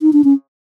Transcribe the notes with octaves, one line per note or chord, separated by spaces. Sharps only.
D#4
D4
C#4